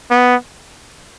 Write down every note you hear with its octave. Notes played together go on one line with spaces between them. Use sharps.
B3